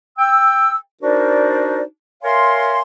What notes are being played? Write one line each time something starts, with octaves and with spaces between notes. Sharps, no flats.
G5 E6
D4 D#4 F#4 A#4 C5 D5
A#4 C#5 E5 F5 G#5 C6